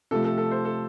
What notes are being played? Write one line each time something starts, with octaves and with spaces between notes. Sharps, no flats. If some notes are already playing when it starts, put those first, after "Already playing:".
C3 F3 A3 A4
A4
A4
C5
A4